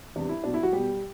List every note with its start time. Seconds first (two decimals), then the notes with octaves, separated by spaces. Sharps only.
0.16 E2 C3 G3 D4
0.29 E4
0.44 B2 F#3 D4
0.54 E4
0.63 F#3 F#4
0.72 B2 G3 G4